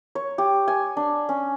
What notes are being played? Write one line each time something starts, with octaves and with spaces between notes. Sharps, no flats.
C#5
G4
G#5
D4
C#4